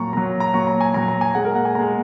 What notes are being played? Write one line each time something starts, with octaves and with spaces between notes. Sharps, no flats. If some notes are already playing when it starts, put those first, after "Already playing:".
Already playing: A#2 F#3 A#5 C#6
A#2 F#3 A#5
A#5
A#2 F#3 C#6
A#5
G#5
A#2 F#3 A#5
A#5
G#5
A#2 G#3 F#5
A#4
F#5
G#5
A#2 G#3 A#5